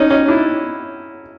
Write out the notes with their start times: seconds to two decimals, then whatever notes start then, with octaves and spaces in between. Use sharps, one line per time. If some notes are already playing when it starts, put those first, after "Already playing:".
Already playing: C#4 D#4
0.10 C#4 D#4
0.28 D4 E4